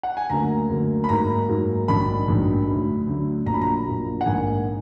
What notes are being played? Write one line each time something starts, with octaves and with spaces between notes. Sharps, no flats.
F#5
G#5
D2 D3 F#3 A#3 A#5
D2 D3 F#3 A#3
B5
G#2 F#3 A#3 A#5
G#2 F#3 A#3
A#1 G#2 D#3 F#3 D4 B5
A#1 G#2 D#3 F#3 D4
D2 D3 F#3
D2 D3 F#3
A#1 A#2 F#3 A#5
B5
A#5
A#1 A#2 F#3
F#5
A#1 G#2 D#3 A#3 D#4 G#5
D#4